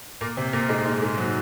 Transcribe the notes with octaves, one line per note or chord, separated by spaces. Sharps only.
A#2 A#3
C3 C4
A#2 A#3
G#2 G#3
G#2 G#3
G#2 G#3
F#3